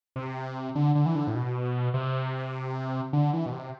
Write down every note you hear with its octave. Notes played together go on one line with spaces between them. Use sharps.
C3
D3
D3
E3
D3
A2
B2
C3
D3
E3
B2
C3